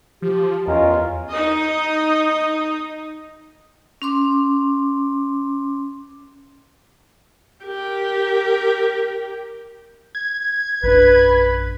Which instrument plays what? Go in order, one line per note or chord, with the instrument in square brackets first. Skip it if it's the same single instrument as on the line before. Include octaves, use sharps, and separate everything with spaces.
[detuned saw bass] F3 [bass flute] G4
[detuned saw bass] E2 [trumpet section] C#4 F4 A#4 [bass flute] D#5
[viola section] D#4 D#5
[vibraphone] C#4 C6 D6
[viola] G4 A#4
[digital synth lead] G#6
[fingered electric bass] A#1 F#2 D4 [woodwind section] B4